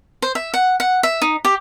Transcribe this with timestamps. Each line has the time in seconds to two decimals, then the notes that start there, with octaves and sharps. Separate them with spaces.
0.22 C5
0.35 E5
0.54 F#5
0.80 F#5
1.03 E5
1.22 D#4
1.45 G4